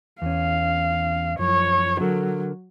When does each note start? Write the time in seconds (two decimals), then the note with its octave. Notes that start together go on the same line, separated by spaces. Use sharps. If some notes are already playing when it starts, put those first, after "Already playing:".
0.22 E2 C#4 F5
1.39 F#2 F3 C#5
2.00 D3 F#3 A4 A#4